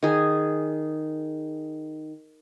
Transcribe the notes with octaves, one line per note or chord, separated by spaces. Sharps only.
D#3 G#4